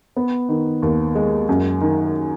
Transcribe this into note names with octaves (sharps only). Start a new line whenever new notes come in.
B3
D#3
D#2
G#3
F#2
D#3